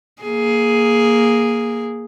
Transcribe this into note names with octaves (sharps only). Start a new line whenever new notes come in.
A#3 G#4